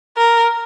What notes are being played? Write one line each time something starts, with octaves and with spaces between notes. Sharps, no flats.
A#4